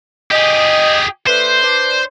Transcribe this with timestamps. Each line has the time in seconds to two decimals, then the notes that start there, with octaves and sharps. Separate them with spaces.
0.32 G4 G#4 D#5
1.27 A3 D4 B4 C5
1.63 D4 B4